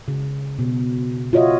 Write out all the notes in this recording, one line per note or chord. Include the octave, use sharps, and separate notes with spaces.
C#3
B2
F4 F#4 C#5 D#5 E5